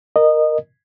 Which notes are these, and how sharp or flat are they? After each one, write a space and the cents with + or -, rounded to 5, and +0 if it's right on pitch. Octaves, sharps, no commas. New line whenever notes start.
A#4 +0 D#5 -20